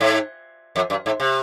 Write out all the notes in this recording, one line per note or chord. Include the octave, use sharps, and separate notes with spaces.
G#2
F2
F#2
G#2
C3